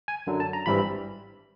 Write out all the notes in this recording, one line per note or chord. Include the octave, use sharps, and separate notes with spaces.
G#5
F#2 D3 F#3
A5
A#5
G#1 G2 E3 G3 C4 B5